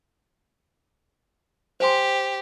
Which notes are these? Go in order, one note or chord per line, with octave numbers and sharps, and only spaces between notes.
G4 C5 G#5 C6